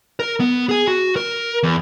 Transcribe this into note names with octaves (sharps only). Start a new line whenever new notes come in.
A#4
B3
G#4 G#5
F#4
A#4
E2